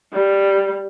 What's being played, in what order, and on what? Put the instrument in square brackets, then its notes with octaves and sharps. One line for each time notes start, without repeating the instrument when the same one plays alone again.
[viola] G3